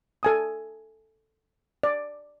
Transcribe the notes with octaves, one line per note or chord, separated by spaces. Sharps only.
A4 G#5 D#6
D5